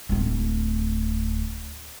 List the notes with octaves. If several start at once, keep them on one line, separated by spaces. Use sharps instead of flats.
D1 A3